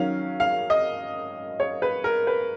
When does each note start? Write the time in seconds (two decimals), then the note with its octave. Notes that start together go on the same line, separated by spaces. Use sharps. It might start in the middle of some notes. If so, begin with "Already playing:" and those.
Already playing: D#3 F#3 C#4 F5
0.40 F5
0.70 D#5
1.60 C#5
1.82 B4
2.04 A#4
2.27 B4